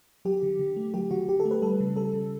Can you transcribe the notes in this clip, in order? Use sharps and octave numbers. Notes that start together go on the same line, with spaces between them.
F#3 G4
D3
D3
A3
F#3 G4
D3 F#4
D3 G4
A4
A3
B4
G3 A4
C#3
G3 A4
C#3